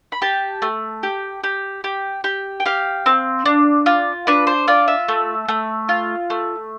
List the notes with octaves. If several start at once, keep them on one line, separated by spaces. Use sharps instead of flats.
B5
G4 A5
A3
G4
G4
G4
G4
G5
G4 F5
C4
D4
F4
D4 B4
C5
F4 D5
E5
A3
A3
F4
A3